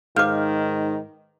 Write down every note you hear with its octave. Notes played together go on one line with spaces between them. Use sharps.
G#2 D#3 B4 F5 D6 F6 G6